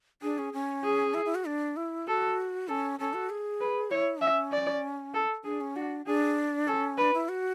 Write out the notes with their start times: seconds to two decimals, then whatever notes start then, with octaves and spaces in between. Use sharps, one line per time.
0.22 D4 G#4
0.38 C#4
0.53 C#4
0.84 G#4
1.14 E4
1.25 E4
1.35 F#4
1.45 D4
1.77 E4
2.07 F#4 A4
2.68 C#4 A4
2.99 C#4 A4
3.14 F#4
3.30 G#4
3.61 B4
3.91 E4 C#5
4.21 C#4 E5
4.52 D5
5.14 A4
5.44 D4 G#4
5.61 C#4
5.76 D4 F#4
6.06 D4 G#4
6.68 C#4 A4
6.98 D4 B4
7.14 E4
7.29 F#4